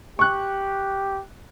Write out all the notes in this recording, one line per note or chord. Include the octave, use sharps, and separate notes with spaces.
G4 C#6 F#6